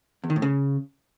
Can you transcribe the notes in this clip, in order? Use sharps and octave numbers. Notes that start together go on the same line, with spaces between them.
E2
D#3
A2
C#3